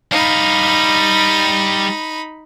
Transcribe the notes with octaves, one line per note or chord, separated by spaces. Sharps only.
G3 D#4 F5 B5